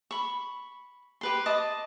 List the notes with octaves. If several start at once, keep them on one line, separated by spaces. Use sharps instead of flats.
B5 C#6
G4 B4 C6
D#5 A5 D6